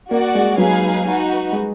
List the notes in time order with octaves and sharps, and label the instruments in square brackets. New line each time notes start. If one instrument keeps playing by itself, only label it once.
[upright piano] A#3 [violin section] F#4 D5 F#5
[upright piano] G#3
[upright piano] F#3 [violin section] D#4 G#4 B4 F5 G#5
[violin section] D#4 F#4 B4
[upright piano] G#3